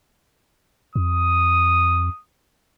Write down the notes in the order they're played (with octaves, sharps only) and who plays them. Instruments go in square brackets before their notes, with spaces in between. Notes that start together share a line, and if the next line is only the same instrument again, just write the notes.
[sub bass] F2 [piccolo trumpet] D#6